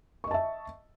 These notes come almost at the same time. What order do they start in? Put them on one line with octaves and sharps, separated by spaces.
C#6 D#5 A5 E5